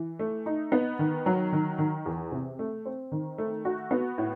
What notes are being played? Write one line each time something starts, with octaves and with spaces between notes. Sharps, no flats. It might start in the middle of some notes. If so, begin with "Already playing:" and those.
Already playing: E3
A3
D#4
B3
D#3
F#3
D#3
D#3
E2
C3
A3
C4
D#3
A3
F#4
B3
A2